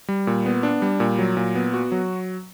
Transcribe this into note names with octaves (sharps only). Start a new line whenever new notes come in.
G3
A#2
B3
D4
G3
A#2
F#3
A#2
B3
F#4
F#3